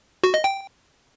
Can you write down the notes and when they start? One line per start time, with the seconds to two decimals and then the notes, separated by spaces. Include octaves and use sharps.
0.24 F#4
0.34 D#5
0.44 G5